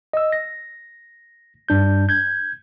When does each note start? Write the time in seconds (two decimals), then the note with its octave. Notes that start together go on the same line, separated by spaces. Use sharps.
0.13 D#5 E6
0.32 A#6
1.69 G2 D4 G6
2.09 G6 G#6